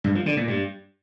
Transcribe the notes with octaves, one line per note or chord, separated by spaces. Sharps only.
G2
F3
D3
A#2
G2